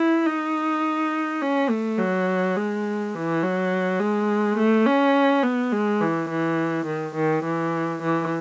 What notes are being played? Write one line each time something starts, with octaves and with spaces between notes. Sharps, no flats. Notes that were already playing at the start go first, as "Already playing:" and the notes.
Already playing: E4
D#4
C#4
A3
F#3
G#3
E3
F#3
G#3
A3
C#4
B3
G#3
E3
E3
D#3
D#3
E3
E3